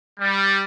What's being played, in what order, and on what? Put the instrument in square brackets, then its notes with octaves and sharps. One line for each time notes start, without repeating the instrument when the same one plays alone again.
[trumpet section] G3